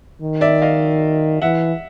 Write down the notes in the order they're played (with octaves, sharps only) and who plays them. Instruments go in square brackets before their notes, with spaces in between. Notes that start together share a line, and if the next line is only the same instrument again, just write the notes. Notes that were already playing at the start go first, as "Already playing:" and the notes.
[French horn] D#3
[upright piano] D5 E5
D#5 F5
[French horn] E3 [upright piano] E5 F#5